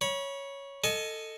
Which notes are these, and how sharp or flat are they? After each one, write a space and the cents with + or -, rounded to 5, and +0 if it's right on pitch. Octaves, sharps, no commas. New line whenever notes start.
C#5 +0 B5 -35
A4 +15 D#5 +0 G#5 +40